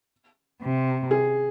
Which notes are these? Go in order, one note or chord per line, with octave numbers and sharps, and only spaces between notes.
C3
G#4